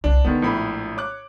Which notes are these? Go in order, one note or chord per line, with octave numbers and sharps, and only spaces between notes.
C2 D4
D3 D#3 G#3 B3
A#1 A2 B5
C#5 D6 F#6